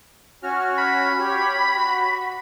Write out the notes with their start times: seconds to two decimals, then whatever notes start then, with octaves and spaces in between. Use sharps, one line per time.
0.43 C#4 F#4 F6
0.78 B5
1.19 G4 C#5
1.76 F#4